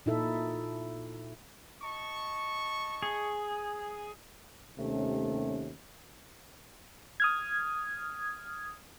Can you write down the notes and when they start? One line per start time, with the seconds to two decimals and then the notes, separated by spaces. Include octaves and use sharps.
0.06 A#2 D#4 E4 A4 E5
1.82 D#5 A5 C#6
3.03 G#4
4.79 D#2 C3 A3 C#4
7.20 D#6 F6 G#6